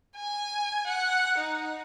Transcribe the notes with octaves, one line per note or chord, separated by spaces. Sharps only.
G#5
F#5
D#4